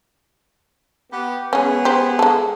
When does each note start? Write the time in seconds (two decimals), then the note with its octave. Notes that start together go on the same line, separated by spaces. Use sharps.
1.13 B3 G4
1.53 G#3 B3 C#4 G#4
1.85 G4 C5
2.19 G#3 A4